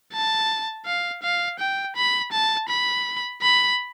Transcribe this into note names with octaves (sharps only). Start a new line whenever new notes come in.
A5
F5
F5
G5
B5
A5
B5
B5